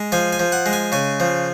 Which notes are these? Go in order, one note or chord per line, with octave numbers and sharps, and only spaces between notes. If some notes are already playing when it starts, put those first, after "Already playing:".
Already playing: G#3
F3 G#5
G#5
F3
F#5
G#3
G#5
C#3 G#5
F3